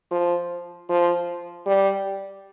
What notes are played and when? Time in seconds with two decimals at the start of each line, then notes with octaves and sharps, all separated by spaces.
0.11 F3
0.89 F3
1.67 G3